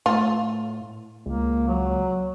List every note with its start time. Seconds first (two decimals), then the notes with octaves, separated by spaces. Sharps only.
0.06 A2 F4
1.26 C#2 A#3
1.68 F#3